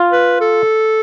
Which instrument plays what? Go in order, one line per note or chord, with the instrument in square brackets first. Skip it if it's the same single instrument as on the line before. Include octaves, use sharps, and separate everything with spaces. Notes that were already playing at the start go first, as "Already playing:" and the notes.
Already playing: [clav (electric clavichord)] F4
[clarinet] B4
A4